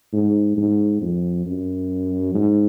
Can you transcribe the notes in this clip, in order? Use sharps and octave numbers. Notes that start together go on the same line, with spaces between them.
G#2
G#2
F2
F#2
G#2